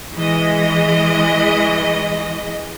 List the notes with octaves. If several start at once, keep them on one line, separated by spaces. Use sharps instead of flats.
E3 G#3 D#5